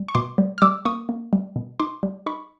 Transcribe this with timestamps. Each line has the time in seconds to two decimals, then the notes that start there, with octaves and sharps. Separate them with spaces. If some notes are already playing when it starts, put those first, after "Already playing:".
Already playing: G3
0.08 C#6
0.15 B2 C6 D6
0.38 G3
0.58 F6
0.62 G3 D6 E6
0.85 A#3 C#6 D#6
1.09 A#3
1.33 G3
1.56 B2
1.80 D#4 C6 D6
2.03 G3
2.26 D#4 B5 C#6